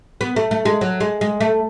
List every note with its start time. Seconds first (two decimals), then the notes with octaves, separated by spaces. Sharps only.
0.21 B3
0.36 A3
0.51 A3
0.65 G#3
0.81 F#3
1.00 G#3
1.21 G#3
1.40 A3